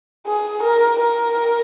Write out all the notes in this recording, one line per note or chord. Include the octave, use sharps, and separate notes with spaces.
G#4
A#4
A#4